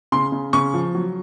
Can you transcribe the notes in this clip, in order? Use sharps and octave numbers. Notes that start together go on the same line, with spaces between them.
C#3 C6
C#3
C#3 C#6
F3
F#3